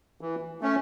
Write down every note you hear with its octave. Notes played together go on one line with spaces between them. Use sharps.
E3
A3 C#4